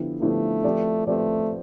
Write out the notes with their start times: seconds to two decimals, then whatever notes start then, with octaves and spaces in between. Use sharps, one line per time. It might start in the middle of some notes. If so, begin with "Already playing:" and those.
Already playing: D3 F3 B3 E4 G4
0.21 D3 F3 A3 B3 E4 G4
0.64 F3 C4 G4 B4 D5
1.07 F3 A3 C4 G4 B4 D5